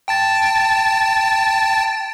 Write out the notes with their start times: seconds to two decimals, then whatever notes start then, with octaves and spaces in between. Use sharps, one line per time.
0.08 G5 A5 A6